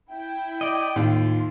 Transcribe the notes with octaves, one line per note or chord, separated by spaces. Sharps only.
E4 G5
D5 D#5
D#2 A2 F4 G#4 D7